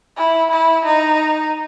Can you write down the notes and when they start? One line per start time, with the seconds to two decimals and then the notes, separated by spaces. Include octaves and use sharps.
0.17 E4
0.50 E4
0.85 D#4